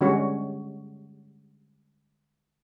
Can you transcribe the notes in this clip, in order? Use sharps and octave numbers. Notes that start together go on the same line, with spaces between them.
D3 G3 G#3 C#4 F#4 C#5